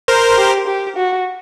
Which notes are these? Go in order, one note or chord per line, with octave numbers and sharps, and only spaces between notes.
A#4 C5
G4
G4
F#4